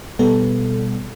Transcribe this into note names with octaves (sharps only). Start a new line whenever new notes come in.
B2 G3 B3 A4